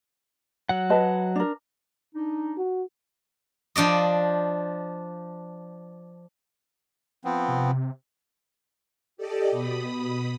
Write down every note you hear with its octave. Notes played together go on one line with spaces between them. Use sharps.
F#3 F#5
B4 D#5 A5
D4 A#4
D4 D#4
F#4
F3 D4 D5 D#5
F3 B3 C4
C3
G4 A4 D5 D#5
B2 B5 D#6